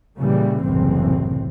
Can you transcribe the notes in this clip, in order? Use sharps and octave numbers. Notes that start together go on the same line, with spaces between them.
A#2 C#3 E3 G3
F#1 C2 A2 E3 C4